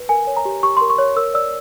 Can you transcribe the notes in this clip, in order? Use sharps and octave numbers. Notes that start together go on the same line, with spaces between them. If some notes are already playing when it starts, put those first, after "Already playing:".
Already playing: B4
A#4 G#5
C#5
A#5
G4
G4 C#6
C6
A#4
C#6
C#5
A#4 E6
D5 E6